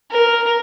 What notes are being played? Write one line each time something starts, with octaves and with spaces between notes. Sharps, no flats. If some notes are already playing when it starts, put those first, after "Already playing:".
A#4